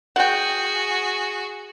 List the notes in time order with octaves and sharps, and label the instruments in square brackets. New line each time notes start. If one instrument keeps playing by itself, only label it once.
[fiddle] F#4 G#4 [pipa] F#5 G5